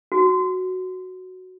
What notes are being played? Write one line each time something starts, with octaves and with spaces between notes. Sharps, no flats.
F#4